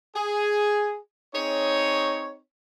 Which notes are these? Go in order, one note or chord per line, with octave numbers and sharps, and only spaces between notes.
G#4
C4 D#4 G#4 C#5